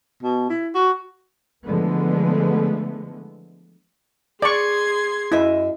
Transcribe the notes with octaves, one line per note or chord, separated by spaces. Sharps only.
B2
E4
F#4
D3 E3 F3 G#3 A3 B3
G#4 D5 C6 C#6 G#6
F#2 E4 D#5 E5